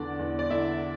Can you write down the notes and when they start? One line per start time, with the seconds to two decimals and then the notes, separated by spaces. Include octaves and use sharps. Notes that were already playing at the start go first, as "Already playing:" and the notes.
Already playing: E2 D3 D4 D5
0.19 E2
0.39 D5
0.50 D3 E4 E5